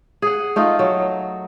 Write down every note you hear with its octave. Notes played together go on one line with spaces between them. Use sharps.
G#4 F#5
A3 D#4 F4
F#3